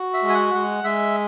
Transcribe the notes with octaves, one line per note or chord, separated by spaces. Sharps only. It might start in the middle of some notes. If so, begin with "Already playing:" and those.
Already playing: F#4
E5
G#3
G#5
F#5
G#3 F#5
G#3 E5